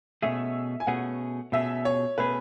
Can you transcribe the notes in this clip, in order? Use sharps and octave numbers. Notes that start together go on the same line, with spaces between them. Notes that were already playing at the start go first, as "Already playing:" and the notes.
B2 A3 C#4 G#4 E5
G#5
B2 A3 C#4 G#4 F#5
B2 A3 C#4 G#4 E5
C#5
B2 A3 C#4 G#4 B4